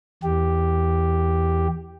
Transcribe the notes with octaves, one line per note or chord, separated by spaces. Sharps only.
E2 G4